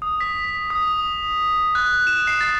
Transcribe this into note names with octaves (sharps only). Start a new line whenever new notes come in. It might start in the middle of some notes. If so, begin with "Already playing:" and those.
D#6
B6
D#6
F#6
E7
C7
A6